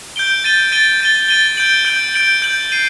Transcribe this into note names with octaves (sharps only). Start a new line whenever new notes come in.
G6 D7 G7
A6 D#7 G7
A6 D#7 G7
A6 D#7 G7
A6 D#7 G7
G6 D7 F#7
G6 D7 F#7
G6 D7 F#7
G6 D7 F#7
C7 D#7 F#7